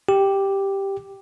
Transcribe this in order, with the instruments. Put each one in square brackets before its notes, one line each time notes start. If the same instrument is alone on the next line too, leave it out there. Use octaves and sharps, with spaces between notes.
[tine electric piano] G4